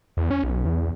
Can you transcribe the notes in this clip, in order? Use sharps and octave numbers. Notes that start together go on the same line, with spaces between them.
E2
C#4
B1
E2